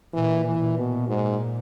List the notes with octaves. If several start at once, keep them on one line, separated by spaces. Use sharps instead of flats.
A#2 E3
E3
A#2
B2
G#2